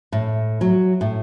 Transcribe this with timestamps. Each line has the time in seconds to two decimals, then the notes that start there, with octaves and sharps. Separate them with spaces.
0.12 A2
0.61 F#3
1.01 A2